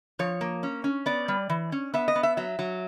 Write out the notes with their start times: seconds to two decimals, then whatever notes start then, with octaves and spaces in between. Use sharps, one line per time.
0.19 F3 C#5
0.41 A#3
0.63 C#4
0.84 C#4
1.06 B3 D5
1.28 G3
1.49 E3
1.72 C#4
1.94 B3 E5
2.08 D#5
2.15 B3
2.23 E5
2.37 F#3 E5
2.59 F#3